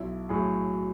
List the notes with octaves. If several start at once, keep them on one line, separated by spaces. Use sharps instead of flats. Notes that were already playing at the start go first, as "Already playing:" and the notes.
Already playing: B1 E4
A2 F#3 G#4